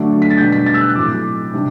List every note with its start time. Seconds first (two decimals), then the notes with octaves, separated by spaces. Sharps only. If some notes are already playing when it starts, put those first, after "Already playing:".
Already playing: D3 F#3 A3 D4
0.22 B6
0.30 A6
0.38 B2 G3 B3 D4 G6
0.52 B6
0.66 A6
0.74 E6
0.81 F#6
0.95 A2 F#3 C4 D6
1.53 C3 G3 D4